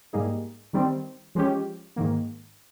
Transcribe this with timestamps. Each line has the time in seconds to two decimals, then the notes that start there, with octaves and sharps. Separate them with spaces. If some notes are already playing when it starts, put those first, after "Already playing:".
0.13 G#2 G3 A#3 D#4 G#4
0.73 D#3 G3 C4
1.35 F3 G#3 C#4 G4
1.96 G#2 D#3 A#3